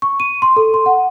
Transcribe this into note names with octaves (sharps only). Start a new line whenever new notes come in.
C#6
D#7
C6
A4
C6
F#5